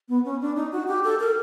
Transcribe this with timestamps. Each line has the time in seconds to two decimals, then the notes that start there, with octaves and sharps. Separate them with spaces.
0.09 B3
0.25 C#4
0.41 D4
0.56 D#4
0.72 F#4
0.88 G4
1.04 A4
1.20 A#4